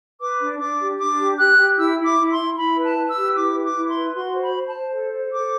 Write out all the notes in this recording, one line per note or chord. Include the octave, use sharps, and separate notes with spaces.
B4 D6
D4
D4 D6
G4
D4 D6
G4
G4 F#6
G4
E4 E6
E4
D6
E4
C6
E4
E4 B5
B4
A5
B4
E6
G4
E4 D6
B4
D6
E4
C6
B4
F#4 C6
C5
B5
C5
A5
C5
A4
C5
A4 D6